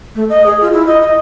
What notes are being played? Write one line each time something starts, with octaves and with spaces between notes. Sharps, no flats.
A3
D#5
G#4
F4
E4
D#5
D#5